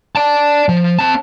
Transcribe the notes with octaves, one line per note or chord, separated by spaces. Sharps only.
D5 A5
F3
C4 A5